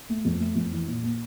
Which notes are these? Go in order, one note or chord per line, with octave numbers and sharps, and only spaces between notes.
A3
F2
A3
F2
E3
A#2
A#3